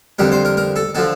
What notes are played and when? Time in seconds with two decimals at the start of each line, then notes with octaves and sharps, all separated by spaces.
0.19 F2 D3 G3 A#4
0.32 C5
0.45 A#4
0.57 A#4
0.76 A4
0.95 D3 F3 A4